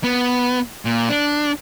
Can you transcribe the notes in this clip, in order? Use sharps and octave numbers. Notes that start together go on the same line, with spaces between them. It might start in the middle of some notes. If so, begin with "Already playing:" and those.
B3
A#2
D4